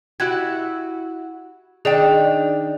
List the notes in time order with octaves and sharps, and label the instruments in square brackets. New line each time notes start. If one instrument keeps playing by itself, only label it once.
[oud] E4 F#4 G4 [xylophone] F#6 G#6
[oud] D#3 D4 D#4 [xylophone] G#4 D5 G5